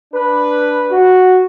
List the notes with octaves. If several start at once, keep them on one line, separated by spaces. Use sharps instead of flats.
D4 B4
F#4